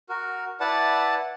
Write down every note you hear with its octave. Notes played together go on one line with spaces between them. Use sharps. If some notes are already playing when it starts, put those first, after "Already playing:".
F#4 A#4
E4 B4 D5 F#5 A5